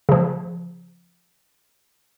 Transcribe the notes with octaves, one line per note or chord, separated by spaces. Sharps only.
C#3 F3